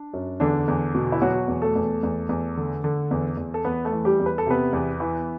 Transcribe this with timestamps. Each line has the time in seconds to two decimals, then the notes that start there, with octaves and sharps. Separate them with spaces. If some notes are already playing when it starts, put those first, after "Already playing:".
Already playing: D4
0.14 F#2
0.40 E2 D3 D4
0.68 E2
0.95 B2
1.12 E4
1.22 B2 F#3 F#4
1.48 E2
1.62 A3 A4
1.76 E2
2.03 E2
2.29 E2
2.57 D3
2.84 D3
3.11 E2
3.37 E2
3.54 A4
3.65 E2 B3 B4
3.85 A3 A4
3.92 E3
4.05 G3 G4
4.20 E2
4.26 B4
4.38 A4
4.46 C3 B3 B4
4.73 E2
5.00 E3